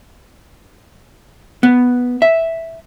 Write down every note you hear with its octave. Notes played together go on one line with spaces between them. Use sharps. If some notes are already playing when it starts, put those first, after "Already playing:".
B3
E5